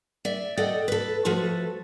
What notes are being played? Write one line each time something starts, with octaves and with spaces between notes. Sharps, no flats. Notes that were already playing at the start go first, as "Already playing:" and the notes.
D5 E5
A4 D5 D#5 F#5 G5
A4 B4
F3 A3 F#4 A4 B4